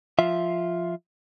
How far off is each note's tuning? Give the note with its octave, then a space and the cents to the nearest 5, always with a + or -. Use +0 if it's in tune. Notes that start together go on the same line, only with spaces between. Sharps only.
F3 +0 F4 +0 E5 +0